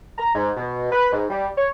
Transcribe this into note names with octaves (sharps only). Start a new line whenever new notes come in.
A#5
G#2
B2
B4
G#2
G3
C#5